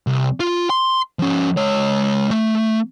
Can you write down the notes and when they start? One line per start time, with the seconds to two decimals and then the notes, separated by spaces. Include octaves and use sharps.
0.07 C2
0.40 F4
0.70 C6
1.19 F3 C#4
1.57 G#3 C#5
2.31 A3